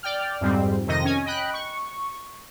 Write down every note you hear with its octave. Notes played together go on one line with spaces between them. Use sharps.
D5 G5 F6
F2 G#2 G3 C4
F2 C3 D#3 D#5 A#6
C#4 G#5
D#5 G5 B5 F#6
C#6